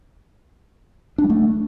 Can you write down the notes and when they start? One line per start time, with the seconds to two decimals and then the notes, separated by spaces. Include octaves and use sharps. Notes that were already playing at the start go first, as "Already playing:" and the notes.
1.18 D4
1.24 G3
1.30 A3